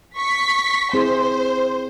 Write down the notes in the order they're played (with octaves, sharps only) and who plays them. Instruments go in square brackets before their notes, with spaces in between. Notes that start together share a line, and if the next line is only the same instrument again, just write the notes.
[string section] C#6 B6
[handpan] C4 E4 G#4 [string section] C5